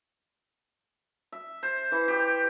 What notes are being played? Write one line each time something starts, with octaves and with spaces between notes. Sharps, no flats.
E5
C5
E3
G4